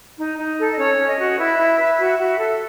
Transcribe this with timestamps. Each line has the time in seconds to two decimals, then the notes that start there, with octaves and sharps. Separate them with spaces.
0.18 D#4
0.38 D#4
0.58 A4
0.71 D#5
0.78 C#4 C#5
0.98 C#4
1.08 D#5
1.18 F#4
1.38 E4 B4 E5
1.59 E4
1.79 B4
1.99 F#4
2.19 F#4
2.39 A4